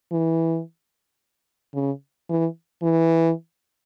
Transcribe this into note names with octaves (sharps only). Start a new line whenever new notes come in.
E3
C#3
E3
E3